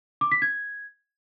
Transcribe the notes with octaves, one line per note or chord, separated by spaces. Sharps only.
D6
B6
G#6